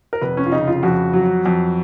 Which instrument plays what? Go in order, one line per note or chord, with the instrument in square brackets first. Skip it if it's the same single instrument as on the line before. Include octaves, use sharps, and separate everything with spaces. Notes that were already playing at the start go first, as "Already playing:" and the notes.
[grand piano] A#4
F1 B4
C#4
F4
C#3 D#4
F4
F2 F#4
F#3
F2